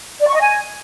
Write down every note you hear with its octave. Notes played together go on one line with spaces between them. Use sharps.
D5
C#6
D#5
G#5